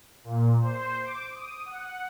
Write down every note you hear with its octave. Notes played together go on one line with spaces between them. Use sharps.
A#2
C5
D6
D#6
F#5